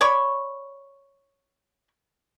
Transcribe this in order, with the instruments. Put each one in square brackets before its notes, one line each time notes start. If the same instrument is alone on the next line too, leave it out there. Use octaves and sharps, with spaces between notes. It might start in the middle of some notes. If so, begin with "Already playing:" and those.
[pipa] C#5 D5 B5 C#6